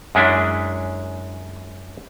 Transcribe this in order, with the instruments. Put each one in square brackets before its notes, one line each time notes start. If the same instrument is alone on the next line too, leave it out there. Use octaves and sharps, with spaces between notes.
[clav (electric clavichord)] F#2 G#3 C#4 D4 E4